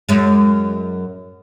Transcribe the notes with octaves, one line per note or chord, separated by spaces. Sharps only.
F#2 G#3